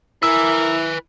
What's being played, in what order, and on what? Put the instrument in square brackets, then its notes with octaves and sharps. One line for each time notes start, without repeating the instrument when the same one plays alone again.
[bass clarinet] E4 [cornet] A#4 [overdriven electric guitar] B4 G#5 [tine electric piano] E6